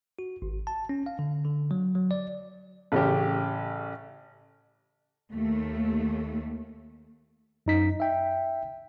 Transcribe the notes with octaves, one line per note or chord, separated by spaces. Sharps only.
F#4
G#1
A5
C#4
F5
D3
D3
F#3
F#3
D5
A1 C#3 C#4 G4
D#2 A3
F#2 D#4 B6
E5 G5